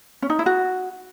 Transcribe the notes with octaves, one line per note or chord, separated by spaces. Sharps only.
C#4
D#4
E4
F#4